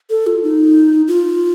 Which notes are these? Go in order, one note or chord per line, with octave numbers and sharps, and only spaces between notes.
A4
F4
D#4
F4